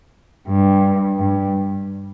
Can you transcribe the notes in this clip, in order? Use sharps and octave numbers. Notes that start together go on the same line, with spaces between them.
G2
G2